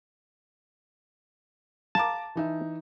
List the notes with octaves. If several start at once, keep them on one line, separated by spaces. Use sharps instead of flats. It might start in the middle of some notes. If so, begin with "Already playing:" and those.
F5 A5 A#5 D6
E3 D#4 E5